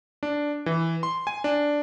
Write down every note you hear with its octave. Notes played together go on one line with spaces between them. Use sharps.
D4
E3
C6
G#5
D4